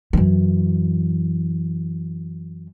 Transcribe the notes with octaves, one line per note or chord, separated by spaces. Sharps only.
F#2 E3